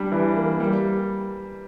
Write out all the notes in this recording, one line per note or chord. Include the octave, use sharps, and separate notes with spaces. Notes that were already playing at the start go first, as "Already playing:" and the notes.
Already playing: G3 D4
E3
A#3
G3